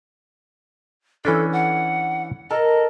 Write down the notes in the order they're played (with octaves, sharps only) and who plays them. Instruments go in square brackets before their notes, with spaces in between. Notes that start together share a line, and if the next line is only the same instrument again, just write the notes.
[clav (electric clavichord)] E3 C#4 D4 [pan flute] A4
[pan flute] F#5
[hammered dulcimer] A4 A#4 [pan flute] D#5